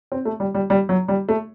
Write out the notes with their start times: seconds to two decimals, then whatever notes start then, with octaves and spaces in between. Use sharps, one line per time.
0.12 C4
0.25 A3
0.40 G3
0.55 G3
0.70 G3
0.89 F#3
1.08 G3
1.29 A3